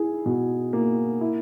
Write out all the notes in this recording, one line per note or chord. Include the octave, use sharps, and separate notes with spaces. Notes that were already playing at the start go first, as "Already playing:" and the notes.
Already playing: E4 G#4
B2
A#3
E4